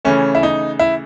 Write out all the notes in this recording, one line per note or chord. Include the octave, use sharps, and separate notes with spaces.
C#3 E3 A3 C#4
E4
D#4
E4